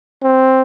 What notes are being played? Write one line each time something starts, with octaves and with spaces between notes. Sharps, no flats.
C4